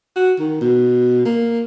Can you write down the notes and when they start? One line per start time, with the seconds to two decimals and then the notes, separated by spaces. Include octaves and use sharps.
0.16 F#4
0.39 D#3
0.61 B2
1.25 A#3